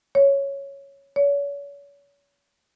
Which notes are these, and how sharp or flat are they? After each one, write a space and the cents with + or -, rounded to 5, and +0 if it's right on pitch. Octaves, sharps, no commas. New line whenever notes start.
C#5 +0
C#5 +40